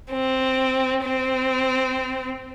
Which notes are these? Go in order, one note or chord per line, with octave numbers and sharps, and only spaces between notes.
C4
C4